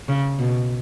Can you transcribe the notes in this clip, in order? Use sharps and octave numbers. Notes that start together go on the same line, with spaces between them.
C#3
B2